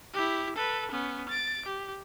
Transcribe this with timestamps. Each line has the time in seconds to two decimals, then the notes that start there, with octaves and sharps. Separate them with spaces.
0.14 E4 G4
0.56 A4 B4
0.91 B3 C#4
1.29 A6 D7
1.66 G4